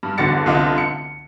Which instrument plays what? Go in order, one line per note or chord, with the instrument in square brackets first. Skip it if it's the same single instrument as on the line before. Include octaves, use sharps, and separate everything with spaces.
[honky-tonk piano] G2
G1 E2 D3 F#4 A6 C#7
F1 C2 D3 F4 D#5 F5
C#7